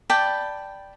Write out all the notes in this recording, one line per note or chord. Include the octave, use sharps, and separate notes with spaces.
D5 G5 A5 B5